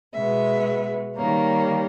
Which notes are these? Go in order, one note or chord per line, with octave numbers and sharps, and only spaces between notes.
B2 G#3 B3 E5
D#3 G3 A#3 C#5